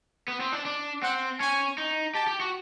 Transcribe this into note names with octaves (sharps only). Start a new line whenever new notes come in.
B3
C4
D4
D4
C4 F#5
C#4 G#5
D#4
G4 A5
G4
F#4